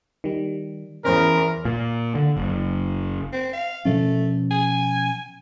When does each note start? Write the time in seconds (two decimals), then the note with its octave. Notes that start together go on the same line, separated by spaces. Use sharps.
0.24 D#3 G3
1.05 E2 C#4 A#4 C5
1.65 A#2
2.15 D3
2.37 F#1
3.33 C4
3.53 F5
3.85 B2 F3 A3 C#4
4.51 G#5